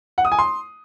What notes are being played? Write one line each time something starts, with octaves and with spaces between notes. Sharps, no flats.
F#5
D#6
G#5
C6